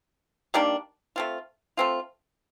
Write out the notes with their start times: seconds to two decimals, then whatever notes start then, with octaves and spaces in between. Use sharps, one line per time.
0.54 D#3 G3 A#3 D4
1.16 A3 C4 F4
1.77 A3 C4 F4